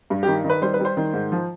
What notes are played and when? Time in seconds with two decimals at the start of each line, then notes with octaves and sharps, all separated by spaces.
0.10 G2
0.23 G4
0.27 D#3
0.44 D#3
0.50 B4
0.62 G3 C5
0.74 B4
0.80 G3
0.85 C5
0.97 D#3
1.14 G#2
1.32 F3